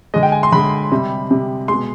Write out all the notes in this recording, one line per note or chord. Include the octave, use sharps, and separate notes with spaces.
D3 G#3 D#5
G5
G#5
C6
D3 G#3 B5
C3 G3
C3 G3
B2 G#3 C6